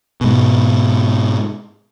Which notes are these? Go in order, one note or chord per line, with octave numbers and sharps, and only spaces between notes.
G#2 B2